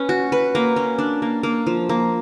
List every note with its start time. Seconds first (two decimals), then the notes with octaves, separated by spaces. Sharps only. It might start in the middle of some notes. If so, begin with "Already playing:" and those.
Already playing: C#4 B4
0.09 F#4
0.32 B4
0.55 A#3
0.76 C#4
0.98 D4
1.22 A#3
1.43 A#3
1.67 F3
1.89 A#3